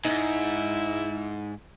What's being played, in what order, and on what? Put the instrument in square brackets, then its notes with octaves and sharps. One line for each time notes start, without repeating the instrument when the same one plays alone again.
[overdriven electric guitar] G#2 [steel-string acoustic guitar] D#4 [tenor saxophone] E4